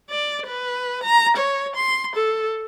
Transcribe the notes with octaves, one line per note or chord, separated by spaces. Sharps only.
D5
B4
A#5
C#5
C6
A4